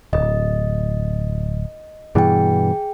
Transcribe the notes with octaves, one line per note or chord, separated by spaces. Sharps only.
D1 D#5
G2 B2 E3 G#4 G5